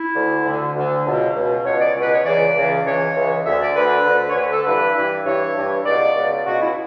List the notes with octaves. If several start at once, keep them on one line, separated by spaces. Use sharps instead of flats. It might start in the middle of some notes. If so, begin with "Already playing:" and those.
Already playing: E4
D2 D3
D2 D3
D2 D3
C#2 B2
C#2 B2
C#2 B2 C#5
D5
C#2 B2 B4
C#5
C#2 C#3 E3 D5
C#2 C#3 E3
C#2 C#3 E3 C#5
C#2 C#3 E3
D2 D3 E5
D5
D2 D3 B4
D2 D3
C#5
D2 D3 B4
A4
G2 E3 B4
G2 E3
G2 E3 C#5
G2 E3
C#2 B2 D5
C#2 B2
C#2 B2 F#4
E4